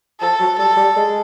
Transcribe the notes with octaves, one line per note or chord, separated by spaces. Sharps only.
F3 A4
F#3
G3 A4
G3
G#3